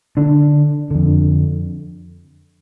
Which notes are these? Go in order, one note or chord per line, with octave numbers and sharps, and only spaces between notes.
D3 D4
F2 D3